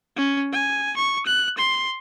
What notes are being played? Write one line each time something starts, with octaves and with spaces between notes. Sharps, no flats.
C#4
G#5
C#6
F#6
C6